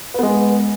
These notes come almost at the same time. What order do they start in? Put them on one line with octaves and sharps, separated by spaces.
B4 B3 G#3